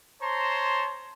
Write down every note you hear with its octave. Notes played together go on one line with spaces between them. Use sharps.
C5 C#5 A5 A#5 C6